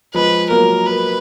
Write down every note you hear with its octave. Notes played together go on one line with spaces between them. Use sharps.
F3 G#3 B4
F#3 A#3 A#4
B4